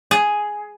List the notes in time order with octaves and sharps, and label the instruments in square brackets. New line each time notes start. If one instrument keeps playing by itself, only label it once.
[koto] G#4